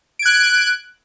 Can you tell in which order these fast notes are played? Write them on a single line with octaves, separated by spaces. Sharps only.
D7 G#6 F#6